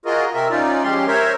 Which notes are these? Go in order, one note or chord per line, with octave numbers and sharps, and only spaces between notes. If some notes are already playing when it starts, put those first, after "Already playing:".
F4 F#4 G#4 A#4 D#5
C3 C4 A#4 E5
C#4 D#4 F4 D5
F3 G#3 C#4 G4 C6
A#4 C5 C#5 E5